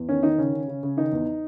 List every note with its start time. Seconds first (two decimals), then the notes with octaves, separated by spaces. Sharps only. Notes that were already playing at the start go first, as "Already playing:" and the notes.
Already playing: E2
0.09 D#3 C#4
0.23 D#3 D#4
0.38 C#3 C#4
0.53 C#3
0.68 C#3
0.83 C#3
0.97 D#3 D#4
1.12 E2